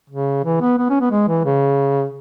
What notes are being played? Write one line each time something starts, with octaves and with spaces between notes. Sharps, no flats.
C#3
E3
B3
B3
C#4
B3
G#3
E3
C#3